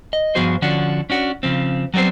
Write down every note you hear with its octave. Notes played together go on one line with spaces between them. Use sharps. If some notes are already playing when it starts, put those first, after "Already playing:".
D#5
G2 F3 B3 F#4 G#4 C5
D3 F3 C#4 D4 F#4
C#4 D4 F#4
C#3 F3 C4
F#3 G3 B3 C4 C5